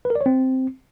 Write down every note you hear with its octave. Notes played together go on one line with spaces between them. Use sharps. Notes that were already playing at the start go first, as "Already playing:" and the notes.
B4
A#4
D5
C#5
C4